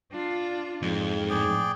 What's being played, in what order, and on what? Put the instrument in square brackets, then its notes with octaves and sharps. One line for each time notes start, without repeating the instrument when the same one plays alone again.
[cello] D4 F4
[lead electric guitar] F2 [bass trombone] G#2
[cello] A2 [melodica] G#4 D5 G5